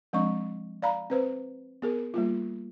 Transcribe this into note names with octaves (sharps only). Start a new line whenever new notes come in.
F3 G#3 C4 D4 D#5 C#6
D5 F5 A#5 B5
C4 B4 C5
B3 G#4 A#4
G3 A#3 F4